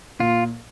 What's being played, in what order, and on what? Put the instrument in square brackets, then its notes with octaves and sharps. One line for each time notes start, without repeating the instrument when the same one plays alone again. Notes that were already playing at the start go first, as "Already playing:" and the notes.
[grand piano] A#2 [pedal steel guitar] F4